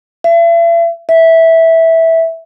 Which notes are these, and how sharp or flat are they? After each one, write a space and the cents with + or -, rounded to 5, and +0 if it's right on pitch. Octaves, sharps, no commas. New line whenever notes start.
E5 +40
E5 -10